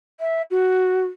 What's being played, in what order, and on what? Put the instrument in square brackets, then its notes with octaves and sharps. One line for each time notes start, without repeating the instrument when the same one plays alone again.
[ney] E5
F#4